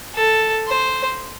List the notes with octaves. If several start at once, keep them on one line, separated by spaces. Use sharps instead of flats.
A4
C5